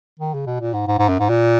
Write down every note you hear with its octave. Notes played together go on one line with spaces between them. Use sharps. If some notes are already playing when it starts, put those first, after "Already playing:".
D#3
C#3
B2
A#2
G#2
G#2
G#2
F#2
G#2
A#2